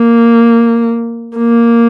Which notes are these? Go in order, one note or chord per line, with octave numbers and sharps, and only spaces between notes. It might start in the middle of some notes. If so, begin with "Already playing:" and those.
Already playing: A#3
A#3